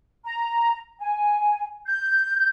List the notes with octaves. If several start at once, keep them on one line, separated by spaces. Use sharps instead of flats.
A#5
G#5
G6